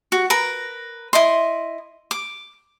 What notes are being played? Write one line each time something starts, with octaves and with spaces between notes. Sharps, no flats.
F#4
A#4 B4 A#5
E4 D#5 C6
D6